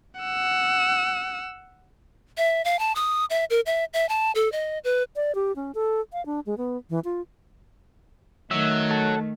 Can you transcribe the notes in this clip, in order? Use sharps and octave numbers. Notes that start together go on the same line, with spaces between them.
F#5 E6
E5
F5
A5
D#6
E5
A#4
E5
E5
A5
A4
D#5
B4
D5
G4
C#4
A4
F5
D4
G#3
B3
E3
F4
D#3 F#3 A3 E5
A4 F#5